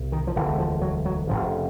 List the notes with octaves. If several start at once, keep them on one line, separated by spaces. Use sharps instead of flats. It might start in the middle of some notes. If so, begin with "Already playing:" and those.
Already playing: C2 B2
D#3
F3
E1 D2 D3 E3
F3
F#3
F#3
F1 D#2 C#3 F3